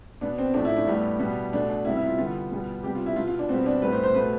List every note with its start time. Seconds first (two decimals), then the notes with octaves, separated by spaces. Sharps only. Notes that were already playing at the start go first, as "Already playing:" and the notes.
0.21 B2 B3 D4
0.38 C4
0.54 A2 F3 A3 D4
0.65 E4
0.77 D4
0.87 A2 G3 B3
1.19 B2 G3 B3
1.53 B2 A3 D4
1.69 D4
1.85 C3 G3 B3 E4
1.96 E4
2.07 F4
2.18 D3 G3 B3 F4
2.51 B2 G3 B3
2.83 C3 G3 B3 G4
2.95 F4
3.06 E4
3.16 B2 B3 F4
3.28 F4
3.39 D4
3.49 B2 G3 B3 C4
3.66 D4
3.82 A2 G3 B3 B4
3.93 C5
4.03 C5
4.15 B2 A3 B4